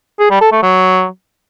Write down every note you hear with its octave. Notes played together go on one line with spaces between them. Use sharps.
G#4
G3
A4
A3
F#3